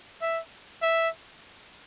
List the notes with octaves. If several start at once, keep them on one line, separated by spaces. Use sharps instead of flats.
E5
E5